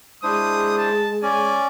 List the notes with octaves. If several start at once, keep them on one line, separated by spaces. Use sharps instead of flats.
G#3 D4 E4 C5 D#6
A5
C#4 D5 G#5